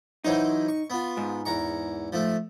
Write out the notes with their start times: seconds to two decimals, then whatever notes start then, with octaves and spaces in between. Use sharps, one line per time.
0.25 E3 F#3 D#4 C5
0.68 C#6
0.90 B3 F4
1.17 G#2
1.45 E2 A#5 C#6
2.13 F3 A3